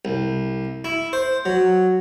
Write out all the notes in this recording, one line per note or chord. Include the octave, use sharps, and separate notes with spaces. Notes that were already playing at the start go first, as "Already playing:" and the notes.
C2
E4
C5
F#3